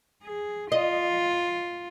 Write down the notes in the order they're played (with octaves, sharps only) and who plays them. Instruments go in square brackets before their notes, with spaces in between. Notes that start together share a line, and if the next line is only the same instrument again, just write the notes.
[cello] G#4
[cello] F4 [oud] D#5